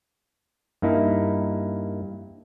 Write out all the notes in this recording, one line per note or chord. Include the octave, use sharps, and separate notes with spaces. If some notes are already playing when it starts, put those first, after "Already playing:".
G2 A#3 D#4 E4